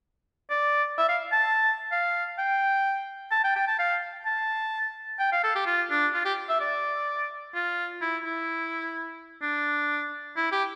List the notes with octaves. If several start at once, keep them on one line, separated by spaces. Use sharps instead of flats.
D5
E5
F5
A5
F5
G5
A5
G5
G5
A5
F5
A5
G5
F5
A4
G4
F4
D4
F4
G4
E5
D5
F4
E4
E4
D4
E4
G4